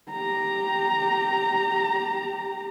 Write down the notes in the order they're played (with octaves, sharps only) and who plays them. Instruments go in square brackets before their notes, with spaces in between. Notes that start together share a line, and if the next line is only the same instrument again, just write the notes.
[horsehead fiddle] G4 A#5